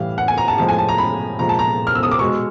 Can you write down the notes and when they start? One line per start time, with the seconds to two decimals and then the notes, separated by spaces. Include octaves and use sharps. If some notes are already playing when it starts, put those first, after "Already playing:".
Already playing: A2 E3 G3 F5
0.18 F#5
0.28 G#5
0.38 A#5
0.48 A5
0.58 A2 F3 G#3 A5
0.69 G#5
0.78 A5
0.89 A#5
0.98 B5
1.39 A#2 F3 G#3 A#5
1.49 A5
1.59 A#5
1.87 F6
1.95 E6
2.03 D#6
2.11 D6
2.19 B2 G#3 C#6